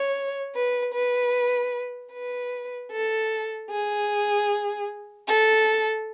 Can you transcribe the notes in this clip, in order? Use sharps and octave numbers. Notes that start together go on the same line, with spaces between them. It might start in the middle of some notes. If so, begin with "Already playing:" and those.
Already playing: C#5
B4
B4
B4
A4
G#4
A4